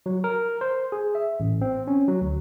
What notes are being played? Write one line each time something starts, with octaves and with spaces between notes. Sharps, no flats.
F#3
A#4
C5
G#4
E5
A1
C4
C#4
F#3
D2